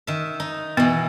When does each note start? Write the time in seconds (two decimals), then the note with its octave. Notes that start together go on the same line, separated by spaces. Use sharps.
0.07 D#3 E5
0.40 D#4
0.77 B2 E3 B3